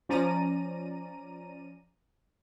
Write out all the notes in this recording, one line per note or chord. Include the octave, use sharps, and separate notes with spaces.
F3 C#4 D5 A#5 D#7